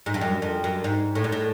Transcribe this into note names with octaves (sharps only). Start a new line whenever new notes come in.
G#2
G2
F#2
F2
F#2
G#2
A2
G#2
A2